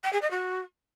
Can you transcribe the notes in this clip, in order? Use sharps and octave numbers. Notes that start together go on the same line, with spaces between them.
G5
G#4
D#5
F#4